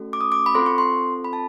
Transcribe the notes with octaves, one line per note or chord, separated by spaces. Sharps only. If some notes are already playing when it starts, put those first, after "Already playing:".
Already playing: A3 C#4 F#4 A4
D6
D#6
D6
B5
C4 F4 A4 C6
C#6
C6
B5
A5